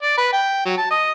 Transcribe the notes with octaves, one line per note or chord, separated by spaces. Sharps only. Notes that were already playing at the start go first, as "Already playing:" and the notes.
D5
B4
G5
F#3
A5
D#5